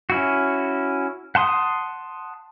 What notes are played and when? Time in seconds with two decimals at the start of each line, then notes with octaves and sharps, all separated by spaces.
0.10 C#4 E4 F#4
1.35 F#5 A5 C6 D#6